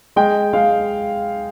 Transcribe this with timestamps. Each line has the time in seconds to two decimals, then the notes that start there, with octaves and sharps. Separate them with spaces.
0.16 G#3 G5
0.53 G#3 F5